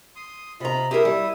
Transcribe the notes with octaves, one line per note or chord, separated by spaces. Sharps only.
C6 D#6
C3 F4 D#5 A#5 B5
E4 G4 G#4 A#4 E5 D#6
G3